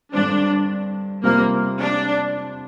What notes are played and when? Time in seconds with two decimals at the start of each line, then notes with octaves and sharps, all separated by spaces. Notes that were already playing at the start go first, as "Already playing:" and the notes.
0.13 G2 D3 G3 C4 D4
1.24 C3 G3 A#3 C4 F4
1.79 D4